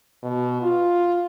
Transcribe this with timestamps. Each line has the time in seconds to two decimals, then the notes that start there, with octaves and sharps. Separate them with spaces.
0.23 B2
0.62 F4